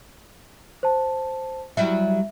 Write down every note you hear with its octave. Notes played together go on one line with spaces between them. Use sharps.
C5 A5
F#3 G3 E4 E5